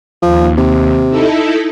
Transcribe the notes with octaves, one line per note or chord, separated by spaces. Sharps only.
D#2 F3
C3
D#4 E4 A4